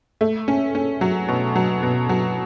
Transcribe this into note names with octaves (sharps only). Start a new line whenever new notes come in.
A3
C#4
C#4
F#3
B2
F#3
B2
F#3